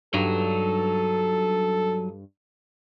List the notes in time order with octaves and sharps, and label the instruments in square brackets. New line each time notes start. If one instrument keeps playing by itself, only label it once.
[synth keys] G2 [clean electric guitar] F#3 D#4 [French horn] A4